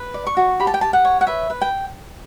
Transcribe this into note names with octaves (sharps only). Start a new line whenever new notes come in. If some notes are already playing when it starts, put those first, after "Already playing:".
Already playing: B4
D5
C#6
F#4
G4 B5
A5
G5
G4 A5
F#5
C#5
F#5
B4 E5
B4
G5